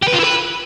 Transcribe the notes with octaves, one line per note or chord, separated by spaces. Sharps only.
G4
B4
F4
E4
B4